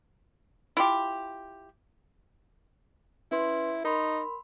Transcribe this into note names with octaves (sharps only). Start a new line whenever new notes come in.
E4 F4 G4
C#4 E4 B4 C6
D#4 A#4 B5 C6